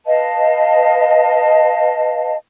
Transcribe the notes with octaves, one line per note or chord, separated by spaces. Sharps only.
B4 D#5 F5 A5